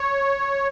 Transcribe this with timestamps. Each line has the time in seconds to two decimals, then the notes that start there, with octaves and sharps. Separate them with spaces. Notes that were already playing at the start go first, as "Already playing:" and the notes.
Already playing: C#5